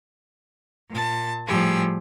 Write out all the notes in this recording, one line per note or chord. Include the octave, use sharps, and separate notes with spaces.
A#2 A5
A2 F3 G3 G4 G#4 E6